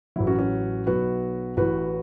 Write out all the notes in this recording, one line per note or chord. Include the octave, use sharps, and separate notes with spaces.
A1 A2 F#3 E4
C#4 F#4
C#4 F#4
B1 B2 F#3 F#4 B4
A1 A2 E3 F#4 B4